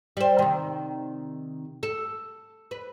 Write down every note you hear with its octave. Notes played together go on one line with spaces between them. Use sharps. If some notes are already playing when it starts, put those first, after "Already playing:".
G3 C5
C3 D#3
A4
B4